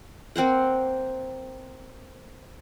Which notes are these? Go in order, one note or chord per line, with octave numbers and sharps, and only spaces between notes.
A#3 C4 C5 F#5